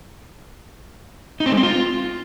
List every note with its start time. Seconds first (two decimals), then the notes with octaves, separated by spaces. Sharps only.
1.40 D#4
1.46 C4
1.52 G#3
1.57 C4
1.63 F4